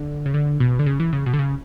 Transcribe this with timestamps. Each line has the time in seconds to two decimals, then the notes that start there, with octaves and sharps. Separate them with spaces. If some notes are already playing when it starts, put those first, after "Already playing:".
Already playing: D3
0.26 C#3
0.34 D3
0.60 B2
0.79 D3
0.87 C#3
1.00 E3
1.13 C#3
1.26 B2
1.33 D3
1.39 C#3